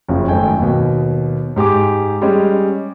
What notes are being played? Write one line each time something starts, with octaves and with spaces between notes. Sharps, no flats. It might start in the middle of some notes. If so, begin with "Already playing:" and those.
F#1 F2 C#3 F3
G#1 F#2 A3 D#4 G5 G#5
D#2 B2
G#2 G4 G#5 D6
G3 G#3 C#4